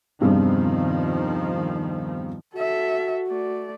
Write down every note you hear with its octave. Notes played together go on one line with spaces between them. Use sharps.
E2 G2 C3 D#3 F3
F#4 A4 E5
A3 D5